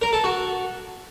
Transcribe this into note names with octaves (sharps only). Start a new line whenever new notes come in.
A#4
A4
F#4